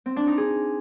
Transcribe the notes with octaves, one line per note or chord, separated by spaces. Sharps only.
C4
D4
D#4
G#4